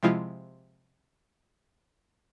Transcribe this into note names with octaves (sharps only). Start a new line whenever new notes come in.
C3 F3 G#3 E4 F4